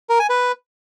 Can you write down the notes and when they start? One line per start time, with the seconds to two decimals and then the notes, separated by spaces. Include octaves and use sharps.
0.09 A#4
0.20 G#5
0.30 B4